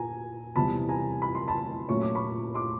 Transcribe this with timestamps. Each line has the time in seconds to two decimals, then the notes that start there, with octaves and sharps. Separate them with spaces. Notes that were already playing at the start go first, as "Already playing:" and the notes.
Already playing: A#2 G#5 A#5
0.56 E2 C3 E3 G3 C4 A5 B5
0.89 G#5 A#5
1.22 B5
1.35 C6
1.48 A5 B5
1.88 A#2 F#3 A3 C#4 C#6
2.02 D6
2.15 B5 C#6
2.54 C6 D6